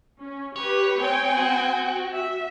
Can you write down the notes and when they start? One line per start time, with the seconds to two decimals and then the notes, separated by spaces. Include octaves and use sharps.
0.18 C#4
0.56 G4 B4 C#5
0.99 C4 G5 G#5
1.37 F#4
2.14 E5